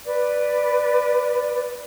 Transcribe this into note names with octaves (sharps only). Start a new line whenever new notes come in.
B4 D5